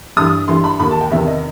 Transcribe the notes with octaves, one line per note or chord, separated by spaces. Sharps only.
G2 E3 D#6
G2 E3 C6
B5
D#2 D#3 B5
A5
G5
E2 C3 D#3 E5
D#5